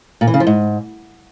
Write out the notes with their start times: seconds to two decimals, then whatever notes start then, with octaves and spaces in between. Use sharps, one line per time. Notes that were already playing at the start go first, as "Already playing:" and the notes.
0.21 A#2
0.27 E3
0.34 C#3
0.40 F3
0.47 G#2